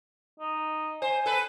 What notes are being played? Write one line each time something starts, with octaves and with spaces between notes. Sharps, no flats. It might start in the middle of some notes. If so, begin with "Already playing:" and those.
D#4
C5 G#5
A4 B4